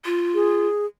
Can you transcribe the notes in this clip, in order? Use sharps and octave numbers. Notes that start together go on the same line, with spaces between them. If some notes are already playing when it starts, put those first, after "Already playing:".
F4
G#4